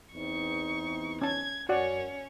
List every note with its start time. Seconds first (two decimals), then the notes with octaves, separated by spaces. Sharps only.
0.15 E2 C4 D#4 C#6
1.22 C#4 A5 G#6
1.69 F#2 C#4 F#4 C#5 D5 F#5